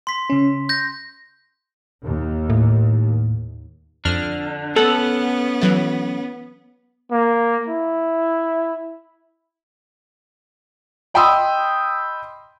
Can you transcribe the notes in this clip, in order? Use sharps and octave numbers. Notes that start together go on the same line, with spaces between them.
C6 B6
C#3 C#4
G6 A#6
D#2
A2
F2 D3 D4 F6
B3 C#4 A4 F#5
E3 F#3 A3
A#3
E4
D#5 G5 B5 C6 D#6 E6